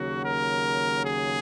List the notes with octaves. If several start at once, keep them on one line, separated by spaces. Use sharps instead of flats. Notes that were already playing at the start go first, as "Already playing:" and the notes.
Already playing: D#2 C#3 F#3 F#4
A#4
G#4